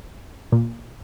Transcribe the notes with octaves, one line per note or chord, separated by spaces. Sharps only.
A#2